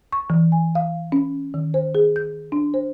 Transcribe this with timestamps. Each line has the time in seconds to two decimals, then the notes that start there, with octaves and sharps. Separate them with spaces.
0.12 C#6
0.30 E3
0.52 G#5
0.75 F5
1.12 C#4
1.54 D#3
1.74 C5
1.95 G#4
2.16 G6
2.52 D4
2.74 C5